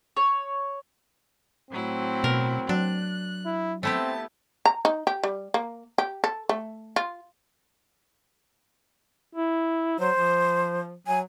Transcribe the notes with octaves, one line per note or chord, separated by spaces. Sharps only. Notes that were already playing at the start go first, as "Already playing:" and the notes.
C#5
A2 F#3 C4 E4
B2 A#4
F#3 D4 F#6
E4
A3 B3 C4 E4 G4 A5
A#5
D#4
G4
G3
A#3
G4
A4
A3
F4
E4
F#3 C5
F3
F#3 G#5